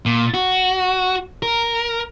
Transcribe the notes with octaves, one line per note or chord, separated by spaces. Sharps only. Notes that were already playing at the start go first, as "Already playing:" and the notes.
A#2
F#4
A#4